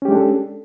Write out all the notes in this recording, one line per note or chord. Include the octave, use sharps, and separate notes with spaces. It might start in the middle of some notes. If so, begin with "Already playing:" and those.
G#3 C#4 D4 G4 A4